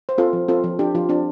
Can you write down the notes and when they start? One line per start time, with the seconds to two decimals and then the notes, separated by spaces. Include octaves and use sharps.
0.09 C5
0.18 C4 F4 A4
0.33 F3
0.48 C4 F4 A4
0.64 F3
0.79 C4 D4 G4
0.95 F3 F4
1.09 C4 D4